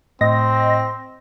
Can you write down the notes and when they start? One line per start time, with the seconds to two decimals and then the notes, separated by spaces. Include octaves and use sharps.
0.21 A2 C4 D#5 A#6